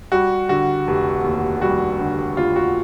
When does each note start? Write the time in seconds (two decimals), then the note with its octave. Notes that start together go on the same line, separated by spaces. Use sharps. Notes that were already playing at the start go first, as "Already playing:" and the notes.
0.12 G3 F#4
0.49 D3 F#4
0.87 F1
1.24 D#2
1.62 G3 F#4
1.99 D3
2.37 F1 F4
2.56 F#4